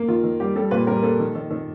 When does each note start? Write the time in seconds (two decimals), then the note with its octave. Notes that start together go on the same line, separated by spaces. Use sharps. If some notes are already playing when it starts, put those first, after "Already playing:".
Already playing: A#3
0.08 D#3 F4
0.23 D#3
0.40 G3 G4
0.56 G3 A4
0.71 A#2 B4
0.87 G3 A#4
1.03 A#3 A4
1.20 D#3
1.35 D#3
1.51 D#3